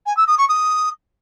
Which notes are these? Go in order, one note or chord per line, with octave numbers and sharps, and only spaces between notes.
G#5
E6
D#6
C#6
D#6